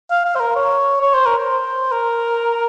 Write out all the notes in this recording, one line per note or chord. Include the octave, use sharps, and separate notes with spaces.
F5
F5
C5
A#4
C#5
C#5
C5
A#4
C5
A#4